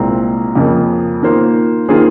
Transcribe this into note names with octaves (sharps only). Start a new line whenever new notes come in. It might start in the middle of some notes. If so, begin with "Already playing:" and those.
Already playing: C2 A#2 G#3 C4
F2 C#3 F3 A#3
D#3 A#3 F4 C5
D#3 A#3 F4 G#4 C5